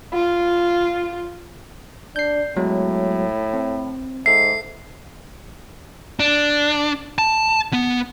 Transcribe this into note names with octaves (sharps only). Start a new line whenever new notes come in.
F4
D4 G6 C7
A2 F#3 G#3 B3
C4
G#2 A4 E5 C7
D4
A5
B3